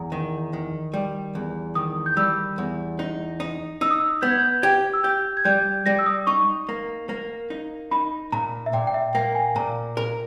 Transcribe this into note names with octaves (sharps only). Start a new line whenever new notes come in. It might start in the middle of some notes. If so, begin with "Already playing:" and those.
Already playing: E2 A#5
D#3
D#3
G3
E2
D#3 D#6
G6
G3 E6
E2
D#4
D#4
D#4 E6
D#6
E6
B3 G6
G#6
G6
G4 G#6
E6
G4 G6
G#6
G3 G6
G3 A#6
E6
D#6
D#4 C#6
A#3
A#3
D#4
D#4 B5
A#2 A#5
E5
A#2 G5
G5
E5
A#3 G5
G#5
A#2 A#5
A#4